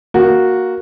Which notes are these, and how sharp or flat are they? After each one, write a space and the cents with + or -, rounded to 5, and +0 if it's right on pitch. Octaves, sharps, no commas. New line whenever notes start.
A#3 +0 F#4 -5